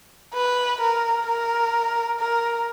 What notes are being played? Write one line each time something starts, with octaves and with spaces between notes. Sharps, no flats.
B4
A#4
A#4
A#4